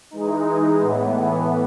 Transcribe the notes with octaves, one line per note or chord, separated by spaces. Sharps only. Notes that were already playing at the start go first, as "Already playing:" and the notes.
E3 G#3 D#4
A2 E3 B3